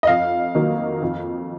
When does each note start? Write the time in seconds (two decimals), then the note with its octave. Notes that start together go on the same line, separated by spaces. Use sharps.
0.03 D#5
0.07 F2 F5
0.55 D#3 F#3 A#3
1.02 F2